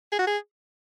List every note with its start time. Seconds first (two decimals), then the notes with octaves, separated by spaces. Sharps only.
0.12 G#4
0.19 F#4
0.27 G#4